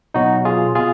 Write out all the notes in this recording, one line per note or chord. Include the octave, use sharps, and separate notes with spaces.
B2 F#3 D#4 F#4
F4 G#4
B2 F4 G#4